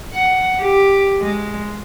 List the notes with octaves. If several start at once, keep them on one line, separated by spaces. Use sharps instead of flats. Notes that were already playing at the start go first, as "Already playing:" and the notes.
F#5
G4
G#3